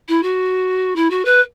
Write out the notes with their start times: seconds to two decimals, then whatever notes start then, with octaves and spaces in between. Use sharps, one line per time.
0.08 E4
0.23 F#4
0.96 E4
1.10 F#4
1.25 B4